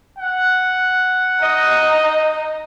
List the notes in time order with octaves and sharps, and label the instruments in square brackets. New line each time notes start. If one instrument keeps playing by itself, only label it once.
[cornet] F#5
[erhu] D#4 [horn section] D#5